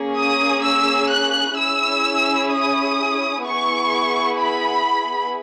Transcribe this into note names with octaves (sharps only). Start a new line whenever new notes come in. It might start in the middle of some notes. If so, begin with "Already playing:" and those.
Already playing: A#3 C#4 G#4
D#6
E6
F#6
C#4 E4 G#4 E6
D#6
B3 E4 G#4 C#6
B5